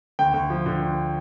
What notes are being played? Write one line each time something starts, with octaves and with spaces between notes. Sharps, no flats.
D2 G5
D2
F3
D3
D2